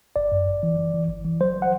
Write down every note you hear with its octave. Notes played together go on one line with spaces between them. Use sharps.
G1 D5
F#2
G1
E3
E3
E3
G1
E3
F#3 C5
F#5